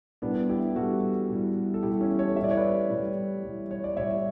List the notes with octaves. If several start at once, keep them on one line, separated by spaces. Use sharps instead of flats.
A2 G3 B3 D4
E4 G4
A2 G3 F#4 A4
A2 G3
A4
A2 G3 E4 G4
C#4 E4
A4 C#5
A2 G3 D5 E5
C#5
B4 D5
A2
G3
A2 G3
C#5
D5
A2 G3 C#5 E5